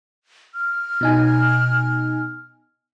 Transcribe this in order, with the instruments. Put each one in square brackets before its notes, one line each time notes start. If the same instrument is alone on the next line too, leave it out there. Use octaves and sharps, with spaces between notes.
[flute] F6
[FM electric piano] B2 D#4 G#5